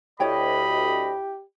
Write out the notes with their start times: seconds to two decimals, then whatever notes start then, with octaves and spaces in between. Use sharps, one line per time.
0.20 D2 E4 G4 C#5 D#5 G5 B5